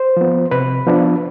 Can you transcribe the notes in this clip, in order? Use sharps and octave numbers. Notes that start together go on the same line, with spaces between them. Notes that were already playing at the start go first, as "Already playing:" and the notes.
Already playing: C5
F3 B3
C3 B4
F3 B3 D4